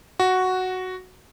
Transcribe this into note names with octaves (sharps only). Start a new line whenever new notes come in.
F#4